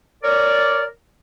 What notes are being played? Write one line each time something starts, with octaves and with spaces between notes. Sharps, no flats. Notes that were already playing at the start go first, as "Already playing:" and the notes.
A#4 C#5 D5